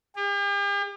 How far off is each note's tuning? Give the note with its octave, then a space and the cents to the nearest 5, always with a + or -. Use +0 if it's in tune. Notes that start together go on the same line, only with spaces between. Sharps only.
G4 +45